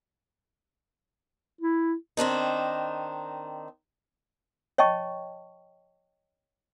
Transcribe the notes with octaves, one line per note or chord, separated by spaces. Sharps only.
E4
D#3 C4 D4 D#4
C#5 D#5 G5 A5 C#6